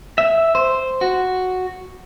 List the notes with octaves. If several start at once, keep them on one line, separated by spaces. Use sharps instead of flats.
E5
C5
F#4